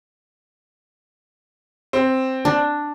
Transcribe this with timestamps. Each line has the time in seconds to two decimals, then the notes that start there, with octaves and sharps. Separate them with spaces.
1.93 C4
2.45 D4